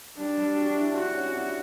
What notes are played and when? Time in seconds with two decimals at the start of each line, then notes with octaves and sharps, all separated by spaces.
0.18 G3 D4
0.37 G3
0.56 F#4
0.75 E4
0.94 D4 F#4
1.13 C#4
1.28 E4
1.33 D4